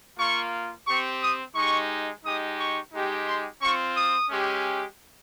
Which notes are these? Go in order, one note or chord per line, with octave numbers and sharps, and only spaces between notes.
A#3 F4 C#6
C4 G4 C#6
D#6
G#3 D#4 G4 C#6
G#3 D#4 G4 D#6
C#6
G#3 D#4 G4
C6
C4 F4 C#6
D#6
G#3 C#4 G4